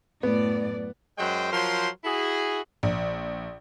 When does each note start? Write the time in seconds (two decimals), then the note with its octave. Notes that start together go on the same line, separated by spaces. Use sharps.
0.23 F#2 A2 B3 D5
1.18 F#2 F#3 G#3 C5 G5
1.52 F3 F#3 A#4 C5 C6
2.04 E4 F#4 G#4
2.83 A#1